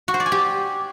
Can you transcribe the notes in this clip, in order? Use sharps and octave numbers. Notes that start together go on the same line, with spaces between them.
F#4
C5
D5
G#5
G4